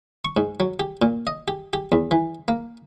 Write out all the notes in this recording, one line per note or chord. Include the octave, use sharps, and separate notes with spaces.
C#6
G#2
F#3
G4
A#2
D#5
G4
G4
E2
E3
A#3